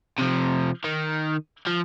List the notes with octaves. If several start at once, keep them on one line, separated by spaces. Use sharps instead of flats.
C3 F3
D#3
F3